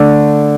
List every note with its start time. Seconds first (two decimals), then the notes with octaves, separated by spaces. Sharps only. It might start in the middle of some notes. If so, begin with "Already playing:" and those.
Already playing: D3 A3